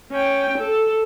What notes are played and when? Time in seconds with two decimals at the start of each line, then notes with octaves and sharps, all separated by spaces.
0.11 C#4 G5
0.58 A4